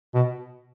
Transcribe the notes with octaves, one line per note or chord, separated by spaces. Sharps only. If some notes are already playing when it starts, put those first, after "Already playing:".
B2